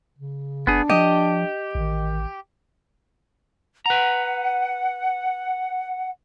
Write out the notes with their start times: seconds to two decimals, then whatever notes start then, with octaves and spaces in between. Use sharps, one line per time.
0.18 C#3
0.67 F#1 B3 D4 G#4
0.90 F3 G4 D#5
1.75 A1 D#3
3.86 B4 F#5 A#5